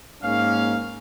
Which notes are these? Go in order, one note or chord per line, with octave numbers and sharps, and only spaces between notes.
G#2 A#3 C#4 F5